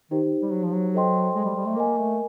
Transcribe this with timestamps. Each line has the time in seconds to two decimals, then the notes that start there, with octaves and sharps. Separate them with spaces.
0.11 D#3 D#4 G4 C5
0.42 G3
0.53 F#3
0.64 F3
0.74 F#3
0.94 A4 C5 D#5 G5 C6
1.35 G#3
1.45 G3
1.56 G3
1.66 A3
1.77 A#3 A#4 D#5 G#5
1.98 A3